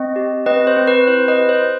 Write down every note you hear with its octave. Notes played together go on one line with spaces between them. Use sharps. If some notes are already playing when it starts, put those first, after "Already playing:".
Already playing: C4 D#5
G4
C4 B4 D#5
C5
C4
B4
E4 C5
B4 D#5
G4
C5